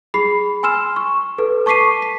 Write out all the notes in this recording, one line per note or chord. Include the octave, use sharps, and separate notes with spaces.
G#4 B5 C7
G#5 C6 E6 F6 E7
C#6
A4 B4
A5 C#6 D6 B6 C7 D#7
B6